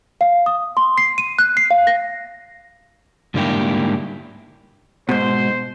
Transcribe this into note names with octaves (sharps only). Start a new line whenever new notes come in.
F5
D#6
C6
C7
D#7
F#6
C7
F5
A#6
G#2 D3 G3 A#3 E4 G4
G#2 B2 C5